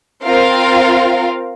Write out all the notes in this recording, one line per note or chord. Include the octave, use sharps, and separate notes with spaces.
C4 F4 A#4 F5